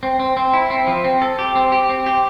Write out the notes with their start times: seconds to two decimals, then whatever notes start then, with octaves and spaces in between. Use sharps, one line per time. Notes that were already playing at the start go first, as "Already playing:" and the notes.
0.03 C4
0.20 C4
0.37 C4
0.54 E4
0.70 C4
0.87 F3
1.04 C4
1.22 A4
1.39 G4
1.55 C4
1.72 G4
1.89 C4
2.06 G4